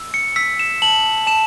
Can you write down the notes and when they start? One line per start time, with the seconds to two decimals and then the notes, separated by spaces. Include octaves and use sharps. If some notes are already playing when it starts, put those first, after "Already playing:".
Already playing: E6
0.14 C#7
0.36 E6 B6
0.59 E7
0.82 A5 F#7
1.27 A5 E7